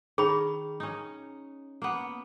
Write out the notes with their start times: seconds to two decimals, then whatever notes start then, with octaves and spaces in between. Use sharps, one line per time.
0.18 D#3 G#4 B5
0.80 C#4 D#4
1.82 A#3 B3